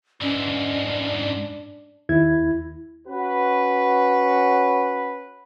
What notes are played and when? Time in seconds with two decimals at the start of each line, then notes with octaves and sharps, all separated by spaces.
0.21 G#2 E3 C#4 D4
2.09 D#2 E4 G#6
3.06 C#4 F#4 B4